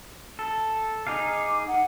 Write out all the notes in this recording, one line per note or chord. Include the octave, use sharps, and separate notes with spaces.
A4
D#4 G#4 F5 D6
F#5